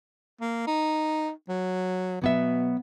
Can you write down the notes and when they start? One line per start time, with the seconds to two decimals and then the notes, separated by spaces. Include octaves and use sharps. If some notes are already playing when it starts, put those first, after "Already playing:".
0.41 A#3
0.67 D#4
1.49 F#3
2.22 B2 F#3 B3 E5